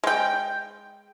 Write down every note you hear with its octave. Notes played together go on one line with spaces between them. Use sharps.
G#3 G5